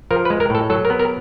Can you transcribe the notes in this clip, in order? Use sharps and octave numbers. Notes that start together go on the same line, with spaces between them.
F3 A#4
B4
G#3
A#4
A2 A4
F#3 A4
A#4
B3
A#4